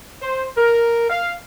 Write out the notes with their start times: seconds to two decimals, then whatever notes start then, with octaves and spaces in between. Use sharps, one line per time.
0.22 C5
0.57 A#4
1.10 F5